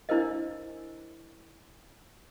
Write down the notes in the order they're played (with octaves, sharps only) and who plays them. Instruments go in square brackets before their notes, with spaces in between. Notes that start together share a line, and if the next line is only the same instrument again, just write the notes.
[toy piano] D4 E4 A#4 C5 D#5